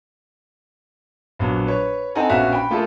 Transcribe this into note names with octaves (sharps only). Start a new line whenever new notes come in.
A#1 B2 F#3
B4 C#5
C4 D#4 A4 F#5 G#5 A#5
A#1 B2 C#4 F#4 E5 F5
G5 B5
A3 A#3 F4 G#4 A4